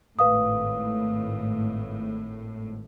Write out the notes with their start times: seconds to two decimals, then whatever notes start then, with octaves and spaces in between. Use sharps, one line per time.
0.19 G#1 A2 B4 F5 D#6